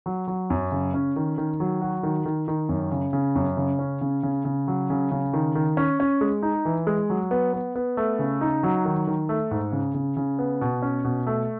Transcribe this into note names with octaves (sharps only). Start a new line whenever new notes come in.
F#3
F#3
F#2
C#3
C#4
D#3
D#3
F#3
F#4
D#3
D#3
D#3
F#2
C#3
C#3
F#2
C#3
C#4
C#3
C#3
C#3
F#3
C#3
C#3
D#3
D#3
C#4
C#4
G#3
D#4
E3
G#3
F#3
B3
B3
B3
A3
C#3
D#4
F#3
D#3
D#3
A3
G#2
C#3
C#3
C#3
B3
B2
C#4
B2
A3